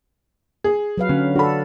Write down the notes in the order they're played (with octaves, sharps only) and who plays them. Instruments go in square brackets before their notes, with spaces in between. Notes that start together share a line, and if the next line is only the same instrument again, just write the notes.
[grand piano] G#4
[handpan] F#3 B4 F5
[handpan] D3 [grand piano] C#4
[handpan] D4 A4 [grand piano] F#4 B5